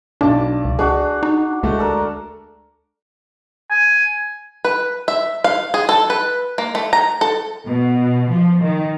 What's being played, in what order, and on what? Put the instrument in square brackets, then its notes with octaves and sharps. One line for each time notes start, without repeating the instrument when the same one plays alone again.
[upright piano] B1 A5 [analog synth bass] D4 [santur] D5
[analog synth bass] C#2
[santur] D4 F#4 [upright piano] G#4
[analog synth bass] D#4
[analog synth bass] D2 [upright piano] G#3 A3
[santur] D4 A4 A#4
[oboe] G#5
[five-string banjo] B4
E5
F5
G#4
A4
B4
A#3
A3
A#5
A4
[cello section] B2
F3
D#3